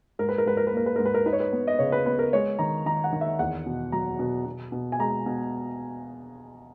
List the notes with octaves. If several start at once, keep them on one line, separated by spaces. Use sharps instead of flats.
G#2 A#4
B4
A#4
G#2 B4
A#4
B4
A#3 A#4
B4
G#2 A#4
B4
A#4
D#4 B4
C#5
B4
B3
D#5
C#3 C#5
B4
B3 B4
A#4
G#3 C#5
D#3 A#5
D#3 A#5
F#5
D#3
E5
E2 F#5
B2
F#3 A#5
B2
B2
B2
G#5
G#3 A#5
B2